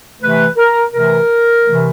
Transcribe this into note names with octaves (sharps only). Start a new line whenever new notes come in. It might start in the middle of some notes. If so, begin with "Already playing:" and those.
C3 E3 A3 B4
A#4
C3 E3 A3 A#4
C3 E3 A3